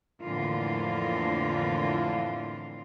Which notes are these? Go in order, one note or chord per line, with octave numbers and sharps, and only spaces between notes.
F2 A2 D3 E3 A#3 F4